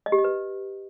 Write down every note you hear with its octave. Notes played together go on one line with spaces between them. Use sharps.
D#5
G4
D#5
B4